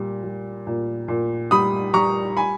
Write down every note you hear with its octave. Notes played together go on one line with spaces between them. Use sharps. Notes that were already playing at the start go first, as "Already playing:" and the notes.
Already playing: A#2 G3
G3
A#2
A#2
G3 B5 D#6
G3 A#5 C#6
G#5 B5